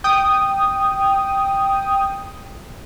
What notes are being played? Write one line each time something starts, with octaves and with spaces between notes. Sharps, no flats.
G5 D#6